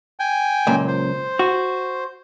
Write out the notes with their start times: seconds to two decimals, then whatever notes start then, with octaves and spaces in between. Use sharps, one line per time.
0.20 G5 G#5
0.67 C#2 F#2 A#2
0.88 C5
1.39 F#4